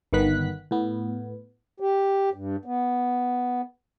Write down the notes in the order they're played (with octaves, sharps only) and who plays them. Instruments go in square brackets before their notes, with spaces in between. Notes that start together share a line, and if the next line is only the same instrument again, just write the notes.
[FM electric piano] G1 D#3 B3 F#6 B6
A2 B3
[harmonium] G4
G2
B3